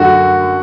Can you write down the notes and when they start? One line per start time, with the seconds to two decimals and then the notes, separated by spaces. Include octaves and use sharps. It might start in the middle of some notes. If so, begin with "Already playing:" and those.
Already playing: F#2 D3 A3 F#4